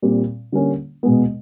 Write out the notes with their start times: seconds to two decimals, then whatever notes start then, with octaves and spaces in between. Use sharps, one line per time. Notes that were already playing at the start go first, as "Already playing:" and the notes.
0.02 A#2 G3 C4
0.52 D3 G3 A#3 C#4
1.03 B2 G#3 B3